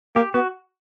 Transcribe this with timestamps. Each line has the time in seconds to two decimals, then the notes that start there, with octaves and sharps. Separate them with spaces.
0.16 A#3 G4
0.34 B3 F#4